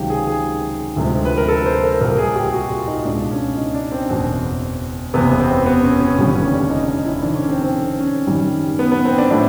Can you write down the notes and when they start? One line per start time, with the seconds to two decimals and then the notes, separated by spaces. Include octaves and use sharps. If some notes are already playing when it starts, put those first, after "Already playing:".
Already playing: C#2 C3 D#3 F#3 G4
0.10 G#4
0.27 G#4
0.96 D2 C3 F3 G#3
1.25 B4
1.38 A#4
1.48 A4
1.66 C5
1.84 A#4
2.01 C2 A#2 G3 A#4
2.18 G#4
2.36 G4
2.53 F#4
2.70 F4
2.88 D#4
3.05 C#2 B2 G#3 D4
3.31 C#4
3.58 D#4
3.74 D4
3.92 C4
4.10 F#1 E2 B2
5.14 F#1 E2 C3 B3
5.40 C4
5.66 B3
5.83 C#4
6.00 C#4
6.18 F1 D#2 D3 G3
6.35 C#4
6.53 D4
6.71 D#4
6.87 D#4
7.05 E4
7.22 F2 C3 D#3 D4
7.35 C#4
7.49 C4
7.62 C4
8.00 C#4
8.27 F#2 D#3 G3
8.79 B3
8.92 B3
9.05 C4
9.18 D4
9.31 A2 F3 A3 D4